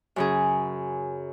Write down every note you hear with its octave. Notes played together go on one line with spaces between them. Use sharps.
F#2 C#3 G#4